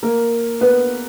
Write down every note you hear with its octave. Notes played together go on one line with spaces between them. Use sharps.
A#3 A#4
B3 B4